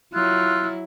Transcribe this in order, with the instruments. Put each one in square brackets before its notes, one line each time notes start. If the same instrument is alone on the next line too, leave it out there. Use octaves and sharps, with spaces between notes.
[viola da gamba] F#3 E4 [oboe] F4 [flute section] E6 F#6